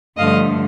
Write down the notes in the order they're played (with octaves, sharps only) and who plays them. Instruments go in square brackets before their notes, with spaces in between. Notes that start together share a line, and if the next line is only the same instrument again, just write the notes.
[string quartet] G2 D3 F3 A3 D#5 F5